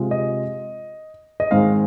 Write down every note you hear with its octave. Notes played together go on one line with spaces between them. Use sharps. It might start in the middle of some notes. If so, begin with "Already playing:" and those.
Already playing: C3 G#3 F4
D#5
D#5
G#2 D#3 G#3 C4 F5